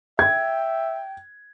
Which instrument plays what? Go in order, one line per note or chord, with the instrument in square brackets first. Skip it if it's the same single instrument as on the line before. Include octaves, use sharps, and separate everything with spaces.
[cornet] E5 [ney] G5 [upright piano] G#6